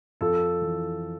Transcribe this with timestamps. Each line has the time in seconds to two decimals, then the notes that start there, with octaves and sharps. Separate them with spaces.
0.21 F2 F4 A4
0.62 E3